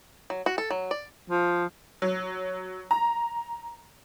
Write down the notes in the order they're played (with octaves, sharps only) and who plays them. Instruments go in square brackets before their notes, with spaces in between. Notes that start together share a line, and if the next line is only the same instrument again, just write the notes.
[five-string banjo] F#3
F#4
A4
F#3
D5
[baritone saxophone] F3
[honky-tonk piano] F#3
A#5